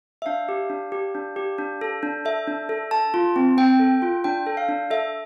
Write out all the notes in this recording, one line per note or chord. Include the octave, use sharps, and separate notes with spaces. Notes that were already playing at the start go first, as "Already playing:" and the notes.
E5
D4 F5
G4
D4
G4
D4
G4
D4
A4
D4
A4 E5
D4
A4
A4 A5
F4
C4
C4 G5
A4
F4
D4 G5
A4
F5
D4
A4 E5